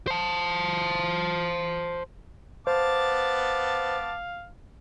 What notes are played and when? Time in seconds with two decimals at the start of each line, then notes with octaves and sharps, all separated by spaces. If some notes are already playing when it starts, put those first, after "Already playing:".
0.07 C5 A5
2.67 B3 C5 F5 A5 D6